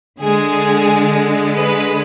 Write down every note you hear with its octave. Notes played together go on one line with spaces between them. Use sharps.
D3 G#3 G#4
B4